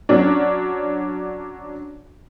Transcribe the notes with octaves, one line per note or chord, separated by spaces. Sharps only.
F#3 C#4 D4